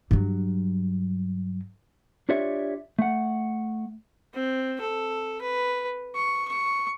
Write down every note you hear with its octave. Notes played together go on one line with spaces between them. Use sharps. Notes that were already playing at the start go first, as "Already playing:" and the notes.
G2 F#3
D4 F4 G4 C#5 D5 E5
A3 F#5
C4
A4
B4
C#6
C#6